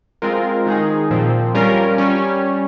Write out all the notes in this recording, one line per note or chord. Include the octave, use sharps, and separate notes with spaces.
G#3 C4 F4 A#4
D#3 G#3 D#4 G#4
A#2 F3 C4
G3 C#4 F4 A#4
G3 C#4